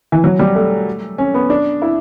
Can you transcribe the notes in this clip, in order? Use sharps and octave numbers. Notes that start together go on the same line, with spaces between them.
E3
F#3
G3
A3
C#4
B3
D4
E4